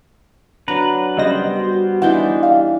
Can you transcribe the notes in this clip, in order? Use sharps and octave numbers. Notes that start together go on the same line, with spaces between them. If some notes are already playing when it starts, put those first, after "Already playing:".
F#3 D4 B4 A#5
C#3 G3 B3 C5 D#5 A#6
F#4
E3 D4 D#4 F#5 G6
G3 F5